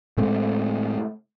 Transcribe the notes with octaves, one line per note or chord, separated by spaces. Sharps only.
A2 G#3 A3 C4